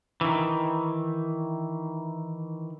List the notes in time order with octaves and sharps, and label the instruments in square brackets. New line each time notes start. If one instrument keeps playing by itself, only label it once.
[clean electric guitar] D#3 E3